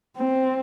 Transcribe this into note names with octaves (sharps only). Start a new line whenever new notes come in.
C4